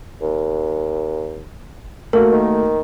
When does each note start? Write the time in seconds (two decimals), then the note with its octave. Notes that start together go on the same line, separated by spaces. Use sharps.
0.22 D#2
2.13 A3 A#3 F#4 A#4
2.32 D#3